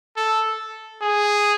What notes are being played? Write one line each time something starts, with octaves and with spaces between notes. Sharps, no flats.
A4
G#4